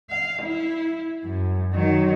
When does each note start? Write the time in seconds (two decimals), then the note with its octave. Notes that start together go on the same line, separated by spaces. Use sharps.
0.10 F5
0.43 E4
1.24 F#2
1.72 D#3 F#3